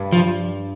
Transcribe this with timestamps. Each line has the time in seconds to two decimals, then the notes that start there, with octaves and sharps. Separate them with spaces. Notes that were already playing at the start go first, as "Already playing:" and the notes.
Already playing: G2
0.12 F3